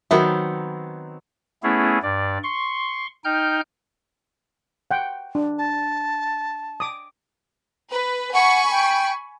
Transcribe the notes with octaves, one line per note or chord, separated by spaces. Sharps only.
D#3 F#3 B3 C4 F#4 A#4 E5
A3 B3 C#4 E4 G#4
G2 D5
C6 C#6
D#4 G5 F6 G6
F#5 G5
D4
A5
D6 D#6
B4
F#5 G#5 B5 C#6
G5